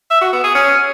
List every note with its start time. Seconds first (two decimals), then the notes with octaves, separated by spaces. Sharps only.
0.10 E5
0.22 F#4
0.33 B3
0.44 G#4
0.55 C#4